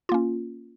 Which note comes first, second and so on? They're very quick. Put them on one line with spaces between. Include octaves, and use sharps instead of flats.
F4 A#3 C#4